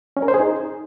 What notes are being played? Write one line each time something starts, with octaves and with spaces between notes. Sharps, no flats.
C#4
A#4
C5
G#4
D#4